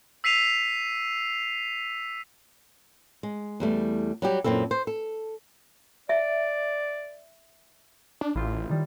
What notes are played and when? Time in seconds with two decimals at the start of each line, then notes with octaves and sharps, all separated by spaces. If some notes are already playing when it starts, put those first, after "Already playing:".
0.24 E6 B6 C7 D#7 F7
3.23 G#3
3.60 E2 G3 A3
4.22 F#3 G3 G4
4.44 F#2 A#2 C4 E4 A4
4.71 C5
4.87 A4
6.09 D5 E5
8.21 D4
8.35 A1 E4 F4 G4
8.69 D#3 G3